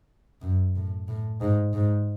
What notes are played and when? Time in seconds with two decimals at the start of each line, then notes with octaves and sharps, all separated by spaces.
0.42 F#2
0.76 A2
1.08 A2
1.41 G#2
1.74 G#2